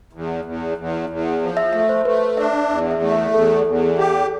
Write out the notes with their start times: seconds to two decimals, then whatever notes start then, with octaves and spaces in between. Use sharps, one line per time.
0.13 E2
0.45 E2
0.78 E2
1.09 E2
1.42 F3
1.57 E5
1.73 A3 E5
1.89 C5
2.05 A3 B4
2.37 D4 E5
2.53 D5
2.70 E2 E5
2.91 E5
3.02 A3
3.12 E5
3.34 E2 A4
3.67 E2
3.98 G4